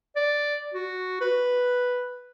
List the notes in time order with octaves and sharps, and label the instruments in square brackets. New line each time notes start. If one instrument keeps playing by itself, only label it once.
[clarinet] D5
F#4
B4